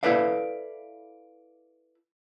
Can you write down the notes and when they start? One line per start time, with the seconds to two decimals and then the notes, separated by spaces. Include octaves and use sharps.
0.03 E4 A4 B4 D5 F5